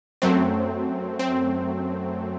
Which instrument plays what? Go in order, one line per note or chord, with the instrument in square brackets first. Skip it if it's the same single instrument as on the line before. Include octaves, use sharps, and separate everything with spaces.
[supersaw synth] F#2 F#3 A3 C4
C4